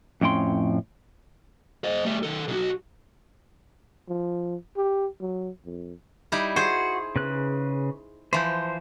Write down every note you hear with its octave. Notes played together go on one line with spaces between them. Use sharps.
F2 A2 C#4 G5 C6
C5 D#5
G3 A3
D#3 A4
B1 F#4
F3
G4
F#3
F2
G3 D#4 E4
F#4 G#4 C5
C#3 B4 F#6
E3 F3 C5 G6